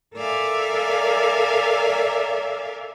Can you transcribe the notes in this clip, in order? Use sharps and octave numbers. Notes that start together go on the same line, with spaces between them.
A4 A#4 D5 E5 F5 G#5